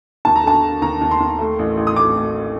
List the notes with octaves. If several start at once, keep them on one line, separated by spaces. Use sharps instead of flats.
D#2 A5
A#5
D3 A5
D3
D#2 A#5
D#2
C6
D#2
A3
A1
A1
D#6
A3 D6
A3